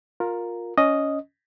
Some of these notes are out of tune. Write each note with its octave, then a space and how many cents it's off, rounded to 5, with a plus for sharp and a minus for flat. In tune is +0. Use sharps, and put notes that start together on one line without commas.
F4 +20 A#4 +0
C#4 +15 D#5 +0